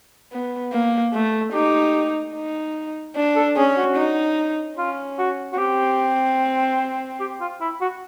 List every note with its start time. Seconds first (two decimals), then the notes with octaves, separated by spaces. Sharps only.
0.32 B3
0.72 A#3
1.13 A3
1.53 D#4 G4
2.34 D#4
3.16 D4
3.35 A4
3.56 C#4 G#4
3.77 F#4
3.96 D#4
4.78 C#4 F4
5.18 F#4
5.53 F#4
5.58 C4 G4
7.20 G4
7.41 F4
7.61 E4
7.81 F#4